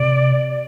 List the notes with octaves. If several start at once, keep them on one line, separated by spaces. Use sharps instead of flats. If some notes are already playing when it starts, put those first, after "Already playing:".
Already playing: C3 D5